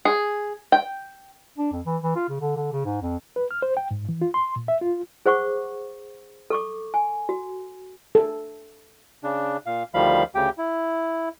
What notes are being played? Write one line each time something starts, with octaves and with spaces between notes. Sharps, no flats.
G#4
G5
D4
F2
E3
E3
F4
C#3
D3
D3
C#3
G#2
F2
B4
F6
C5
G5
G#2
E3
F4
C6
A#2
E5
F4
G#4 C5 F#5 C#6 D6
A4 C#6 D6
G#5
F#4
A4
C#3 D4
A#2 F5
D2 D#3 F3 G3 F5 B5
D2 C#3 G4 G5
E4